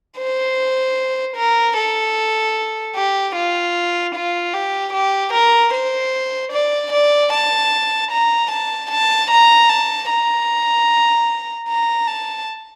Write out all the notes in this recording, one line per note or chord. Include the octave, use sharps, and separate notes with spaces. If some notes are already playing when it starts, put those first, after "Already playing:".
C5
A#4
A4
G4
F4
F4
G4
G4
A#4
C5
D5
D5
A5
A#5
A5
A5
A#5
A5
A#5
A#5
A5